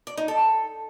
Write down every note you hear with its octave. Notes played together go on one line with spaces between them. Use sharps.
D5
D#4
A4